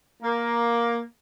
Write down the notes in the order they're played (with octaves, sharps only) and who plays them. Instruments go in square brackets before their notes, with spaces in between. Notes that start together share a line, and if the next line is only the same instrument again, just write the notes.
[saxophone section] A#3